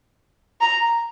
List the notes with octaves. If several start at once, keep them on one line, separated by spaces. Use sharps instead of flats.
A#5